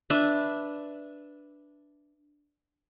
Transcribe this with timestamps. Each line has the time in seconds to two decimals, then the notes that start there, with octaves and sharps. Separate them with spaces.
0.10 D4 B4 E5